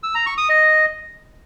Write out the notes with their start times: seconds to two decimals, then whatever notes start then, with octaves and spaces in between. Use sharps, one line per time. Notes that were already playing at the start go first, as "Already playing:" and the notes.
0.03 E6
0.15 A#5
0.26 C#6
0.38 D#6
0.49 D#5